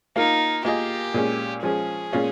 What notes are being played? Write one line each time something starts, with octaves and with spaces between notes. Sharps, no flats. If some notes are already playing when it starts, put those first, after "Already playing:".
A#3 D#4 F4 A#4
A#3 F4 G4 G#4 D#5
A#2 G#3 C#4
F3 G#3 C#4 G#4
A#2 G#3 C#4 F4